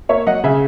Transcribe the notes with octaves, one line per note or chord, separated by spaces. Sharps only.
A#3 C#5 E5
F#3 D#5 F#5
C#3 E5 G#5